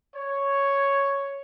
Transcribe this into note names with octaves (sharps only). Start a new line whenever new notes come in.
C#5